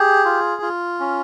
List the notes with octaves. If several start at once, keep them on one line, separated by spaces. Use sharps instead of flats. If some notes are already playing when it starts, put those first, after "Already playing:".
Already playing: G4 G#4
F4
F4
C#4